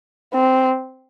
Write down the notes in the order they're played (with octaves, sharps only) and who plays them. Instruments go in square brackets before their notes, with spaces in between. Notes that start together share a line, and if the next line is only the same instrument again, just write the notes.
[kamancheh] C4